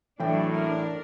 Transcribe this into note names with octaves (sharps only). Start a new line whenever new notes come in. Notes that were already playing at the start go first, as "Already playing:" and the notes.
A2 E3 F#3 D4 G5
D4 A#4